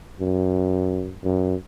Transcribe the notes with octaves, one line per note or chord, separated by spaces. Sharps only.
F#2
F#2